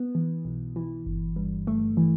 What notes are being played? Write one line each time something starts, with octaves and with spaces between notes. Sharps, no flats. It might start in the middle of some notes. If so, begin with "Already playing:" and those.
Already playing: B3
E3
B1
E3
G1
G2
A3
E3